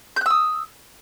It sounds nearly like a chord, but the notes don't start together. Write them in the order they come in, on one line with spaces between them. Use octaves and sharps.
G6 F#6 E6 D#6